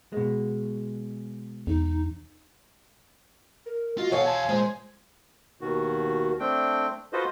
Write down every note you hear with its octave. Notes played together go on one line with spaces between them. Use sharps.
B2 G#3
E2 D#4
A#4
F4 F#4 D#5
E2 B2 A4 C#5 D#5 F5 F#5 G#5
G#5 A5 C6 G#6
A#2 G#3 C5
D#2 B2 D#3 F#4
A3 C4 D4 G5
F4 F#4 A4 B4 C5 D#5